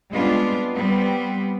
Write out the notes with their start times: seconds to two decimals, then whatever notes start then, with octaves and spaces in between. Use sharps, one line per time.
0.11 G3 G#3 B3 C4 D4 F4
0.75 G3 B3 C4